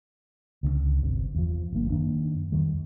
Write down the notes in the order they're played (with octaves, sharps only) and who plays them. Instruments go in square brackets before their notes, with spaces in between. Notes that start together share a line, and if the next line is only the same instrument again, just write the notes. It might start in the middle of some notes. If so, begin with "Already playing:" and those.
[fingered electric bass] C#2 D3 G#3 C#4
G1 C3
E2 F3
G1 G2 A#3
F#2 D#3 A#3 D4
F2 D#3 G3